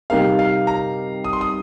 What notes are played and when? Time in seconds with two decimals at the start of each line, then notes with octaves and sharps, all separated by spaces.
0.10 C3 G3 D#4 G4 A#4 F5
0.39 F5
0.67 A#5
1.24 D#6
1.33 C6
1.41 D#6